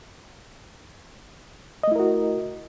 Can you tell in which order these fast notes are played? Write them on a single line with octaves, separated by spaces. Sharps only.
D#5 A3 E4 A#4 F#4